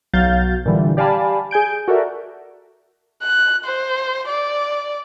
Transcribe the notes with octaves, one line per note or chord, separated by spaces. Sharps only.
B1 F#3 F5 G6 A6
A#2 D3 E3 G3
G4 D5 F5 G#5 A5 B5
G#4 G#5 G6 D7
F#4 A4 A#4 D5 E5
F#6
C5
D5